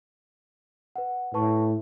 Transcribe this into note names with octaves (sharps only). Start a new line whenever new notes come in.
B4 F#5
A2 B4 A5 C#6